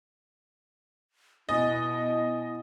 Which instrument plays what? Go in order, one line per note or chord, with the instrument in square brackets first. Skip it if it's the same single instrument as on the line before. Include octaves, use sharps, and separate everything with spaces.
[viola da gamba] B2 [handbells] B3 G#5 A6 [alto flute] E4 [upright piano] D#5